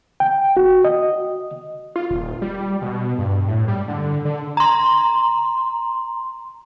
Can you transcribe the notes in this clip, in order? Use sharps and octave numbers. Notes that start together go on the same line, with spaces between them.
G5
F#4
D#5
F4
D#1
G3
B2
G2
A2
G3
D3
D3
A#5 C6